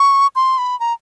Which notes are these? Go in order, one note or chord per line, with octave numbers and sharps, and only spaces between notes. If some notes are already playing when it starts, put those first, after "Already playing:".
Already playing: C#6
C6
B5
A#5